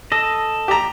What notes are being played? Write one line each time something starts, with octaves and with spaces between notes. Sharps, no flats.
A4 D#5
G4 A#5